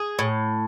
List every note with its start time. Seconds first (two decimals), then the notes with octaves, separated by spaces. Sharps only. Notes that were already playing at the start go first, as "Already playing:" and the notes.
Already playing: G#4
0.19 A2